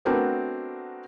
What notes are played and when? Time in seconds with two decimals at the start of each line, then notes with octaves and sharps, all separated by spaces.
0.05 A3 B3 C4 D4 F#4 A#4